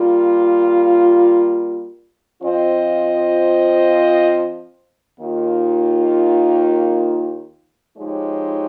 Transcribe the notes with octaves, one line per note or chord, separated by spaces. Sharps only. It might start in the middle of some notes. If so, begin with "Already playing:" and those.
Already playing: G3 A#3 F4
F3 C4 F4 C5 D#5
D#2 D#3 A#3 F4
F3 G#3 D#4 G4 C#5